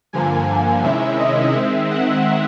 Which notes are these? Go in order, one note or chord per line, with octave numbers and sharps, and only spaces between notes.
G2 D3 F3 A#3 G#5
G#5
C3 D#3 G#3 C#4 E4 E5
D#5
D#3 G#3 C4 E5
F#5